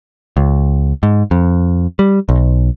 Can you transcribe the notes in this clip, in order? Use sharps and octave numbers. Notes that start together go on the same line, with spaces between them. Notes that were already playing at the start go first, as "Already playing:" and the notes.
C#2
G#2
F2
G3
B1